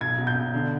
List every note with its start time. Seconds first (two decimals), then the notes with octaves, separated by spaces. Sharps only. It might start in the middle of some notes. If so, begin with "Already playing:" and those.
0.01 B1 G#6
0.18 B2
0.27 G6
0.36 B2
0.53 D3